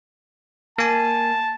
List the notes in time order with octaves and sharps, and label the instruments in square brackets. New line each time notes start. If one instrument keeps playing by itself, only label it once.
[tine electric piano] A#3 G#5 [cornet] A5